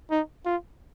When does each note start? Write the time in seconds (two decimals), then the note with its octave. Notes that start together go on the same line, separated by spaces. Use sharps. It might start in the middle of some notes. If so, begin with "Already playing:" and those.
0.11 D#4
0.45 F4